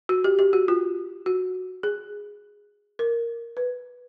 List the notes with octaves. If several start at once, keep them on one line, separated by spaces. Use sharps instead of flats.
F#4
G4
G4
F#4
F4
F#4
G#4
A#4
B4